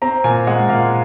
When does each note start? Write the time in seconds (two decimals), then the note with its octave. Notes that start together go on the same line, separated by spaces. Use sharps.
0.02 C4 A#5
0.24 A#2 G#5
0.47 G#3 F#5
0.69 A#2 F5